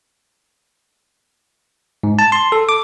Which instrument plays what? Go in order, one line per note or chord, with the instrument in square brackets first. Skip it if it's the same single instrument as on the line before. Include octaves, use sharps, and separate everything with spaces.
[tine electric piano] G#2
A5
C6
A4
D6